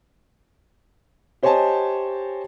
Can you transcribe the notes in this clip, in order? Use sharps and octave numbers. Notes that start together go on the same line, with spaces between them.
G4 C5 C#5 D#5 G#5 A5